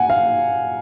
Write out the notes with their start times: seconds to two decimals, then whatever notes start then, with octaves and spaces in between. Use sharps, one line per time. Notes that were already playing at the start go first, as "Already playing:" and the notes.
Already playing: F#5 G#5
0.10 F5